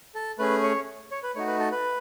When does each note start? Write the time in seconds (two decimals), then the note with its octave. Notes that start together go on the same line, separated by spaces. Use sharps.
0.15 A4
0.39 A3 C#4 G#4 B4
0.63 C#5
1.11 C#5
1.23 B4
1.35 A3 D#4 F#4 C#5
1.47 B4
1.60 A4
1.72 B4